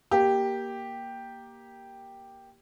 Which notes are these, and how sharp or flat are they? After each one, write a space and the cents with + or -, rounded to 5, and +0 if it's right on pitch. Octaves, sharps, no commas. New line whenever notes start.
A#3 +10 G4 +0